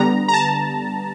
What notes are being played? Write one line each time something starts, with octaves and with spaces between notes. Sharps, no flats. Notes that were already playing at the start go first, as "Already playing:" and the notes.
Already playing: D3 G3 B3 A#5
A#5
A5